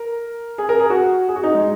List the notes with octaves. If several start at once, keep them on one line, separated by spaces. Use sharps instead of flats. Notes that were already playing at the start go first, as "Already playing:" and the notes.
Already playing: A#4
G#4
A#4
G#4
F#4
G#4
F#4
D#4
G#3